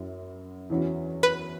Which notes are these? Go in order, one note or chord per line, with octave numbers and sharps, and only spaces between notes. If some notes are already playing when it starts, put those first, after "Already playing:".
Already playing: F#2 F#3 E4
E2 E3 C#4 F#4
B4